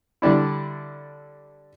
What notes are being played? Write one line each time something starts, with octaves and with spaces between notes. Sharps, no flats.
D3 G3 D4 E4